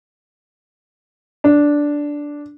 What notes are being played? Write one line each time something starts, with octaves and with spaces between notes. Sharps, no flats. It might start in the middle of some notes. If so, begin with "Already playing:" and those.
D4